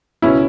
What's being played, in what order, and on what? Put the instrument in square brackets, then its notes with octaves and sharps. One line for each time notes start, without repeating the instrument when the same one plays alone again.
[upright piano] C#2 B2 C#4 E4